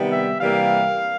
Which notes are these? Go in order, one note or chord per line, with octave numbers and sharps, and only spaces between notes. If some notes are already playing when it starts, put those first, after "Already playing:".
Already playing: C3 D#3 G3 B3
E5
C3 E3 G3 A#3 F5